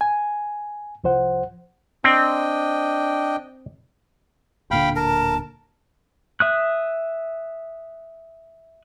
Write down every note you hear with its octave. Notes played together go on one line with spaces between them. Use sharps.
G#5
C2 F3 C5 F#5
C4 D4 D#5 G5
D1 A#2 D3 F5 G5 B5
A#4 A5
E5 D#6 F#6